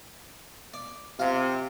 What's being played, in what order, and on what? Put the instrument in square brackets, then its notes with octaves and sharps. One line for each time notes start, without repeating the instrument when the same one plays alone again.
[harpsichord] D5
[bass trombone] C3 [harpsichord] F4 A#5